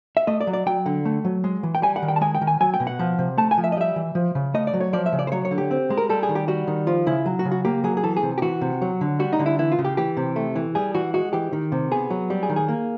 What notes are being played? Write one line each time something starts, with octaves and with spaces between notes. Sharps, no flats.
E5
A3 D#5
D5
F#3
D5
F#3 G5
D3
A3
F#3
G#3
E3
G5
G3 G#5
F#5
D#3
G5
A5
G#3 G#5
G5
D#3
G#5
F#3 G#5
G5
B2
F#5
F3
C3
A3 A5
G#5
F3
E5
D#5
G3 E5
E3
F3
C#3
A3 D#5
D5
F#3
C#5
F3 D5
E5
C#3
D5
C5
F#3 C#5
C#5
D3
G4
C4
G#3
A#4
G3 A4
G#4
D#3
G4
G3 F#4
D#3
F3 F4
C#3 E4
F#3
F#4
C#3
F#4
A#3 G4
F#3 G#4
G#4
E3 A4
G#4
C3
G4
E3 F#4
C3
F#3
D3
G3 F#4
D#4
D3
E4
E3 E4
F4
C#3
G4
E3 G4
C3
A3
E3
G3 G#4
E3 F#4
G#3 F#4
E3 G4
D#3
C3
B3 G#4
F#3
G3
G#4
D#3
G#4
A#3